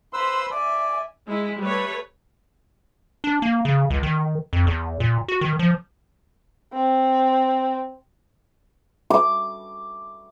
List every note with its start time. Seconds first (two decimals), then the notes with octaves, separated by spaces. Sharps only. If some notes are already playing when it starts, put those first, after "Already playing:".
0.13 B4 C5 B5 C6 E6
0.51 D5 E5 G#5
1.27 G#3 E4
1.60 G3 A3 B4 C#5
3.24 D4
3.42 A#3
3.65 C#3
3.90 C#2
4.03 D#3
4.53 F2
4.67 E2
5.00 A#2
5.28 F#4
5.41 D#3
5.59 F3
6.73 C4
9.10 D6